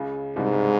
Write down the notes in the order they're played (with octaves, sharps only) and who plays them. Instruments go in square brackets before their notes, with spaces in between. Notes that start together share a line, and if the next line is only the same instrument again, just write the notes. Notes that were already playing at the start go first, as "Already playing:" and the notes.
Already playing: [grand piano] C#2 C#3
[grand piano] C2 C3 [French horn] G#2
[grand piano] G2 G3
G#3